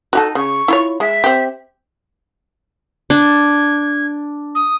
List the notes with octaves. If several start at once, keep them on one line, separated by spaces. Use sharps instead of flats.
D#4 F#4 G4 A4
C#3 C#6
E4 F4 C#5
G#3 E5
C4 G4
D4 G#6
D#6